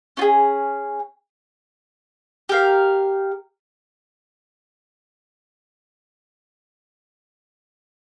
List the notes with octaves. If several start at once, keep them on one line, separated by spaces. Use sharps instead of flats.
C#4 F4 G#4
G4 A#4 F5